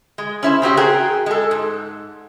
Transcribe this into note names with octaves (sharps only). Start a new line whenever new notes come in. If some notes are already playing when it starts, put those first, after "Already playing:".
G#3
C#4 E4 C5
C#3 C4 F#4 G4
F#4 G#4 A#4 G5
G#3 A4
G#2